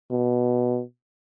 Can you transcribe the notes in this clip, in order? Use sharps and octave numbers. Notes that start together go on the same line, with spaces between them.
B2